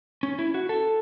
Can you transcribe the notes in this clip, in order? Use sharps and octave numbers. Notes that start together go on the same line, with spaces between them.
C#4
E4
F#4
A4